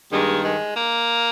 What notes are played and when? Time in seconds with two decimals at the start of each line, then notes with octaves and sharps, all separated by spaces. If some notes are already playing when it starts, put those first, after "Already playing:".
0.11 G2 D#3 G#3 A#3
0.43 G#3
0.76 A#3